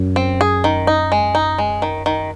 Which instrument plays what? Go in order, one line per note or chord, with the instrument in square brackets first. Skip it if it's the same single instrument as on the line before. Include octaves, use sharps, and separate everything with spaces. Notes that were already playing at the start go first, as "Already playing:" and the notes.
Already playing: [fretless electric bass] F#2
[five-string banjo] C4
G#4
D#3
D#4
G#3
D#4
G#3
D#3
D#3